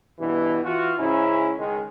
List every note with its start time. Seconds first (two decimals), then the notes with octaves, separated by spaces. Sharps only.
0.19 G2 B2 E3
0.64 E3 F4 F#4
0.98 G#2 C#3 C#4 E4
1.57 C#2 D#3 G#3